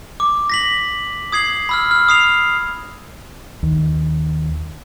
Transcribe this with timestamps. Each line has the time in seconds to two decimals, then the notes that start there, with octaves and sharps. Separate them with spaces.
0.20 D6
0.50 A#6 B6 F#7
1.32 D#6 G#6 C7 F#7
1.69 B5 E6 F6
1.91 E6 F6
2.09 D#6 C7 F7
3.63 D#2